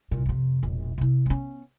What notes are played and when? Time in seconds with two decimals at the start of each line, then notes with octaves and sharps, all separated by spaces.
0.11 C2 A#2
0.26 F2 C3
0.63 E1 A#1
0.98 C3 E4
1.26 B3 C#4